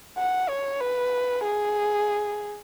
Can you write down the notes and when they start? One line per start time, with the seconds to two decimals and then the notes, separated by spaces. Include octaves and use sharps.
0.18 F#5
0.49 C#5
0.80 B4
1.44 G#4